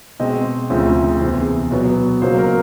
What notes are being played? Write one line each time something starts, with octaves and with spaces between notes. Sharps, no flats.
B2 G#3 C4 D#5
D2 C#3 F3 A3 C4
E2 C3 E3 C5
B2 F#3 B3
C#2 B2 F#3 A#3 C5
A#4